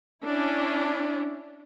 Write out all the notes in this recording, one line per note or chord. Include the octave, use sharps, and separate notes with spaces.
C#4 D4 E4